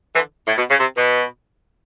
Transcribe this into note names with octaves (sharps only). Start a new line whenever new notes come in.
D3 E3
A2
B2
C#3
C3
B2